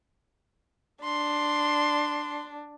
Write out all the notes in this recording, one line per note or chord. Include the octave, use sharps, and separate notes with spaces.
D4 C6